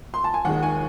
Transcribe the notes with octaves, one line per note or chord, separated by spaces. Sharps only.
C6
A5
G#5
D#2 D#3 G#3 F#5
G#5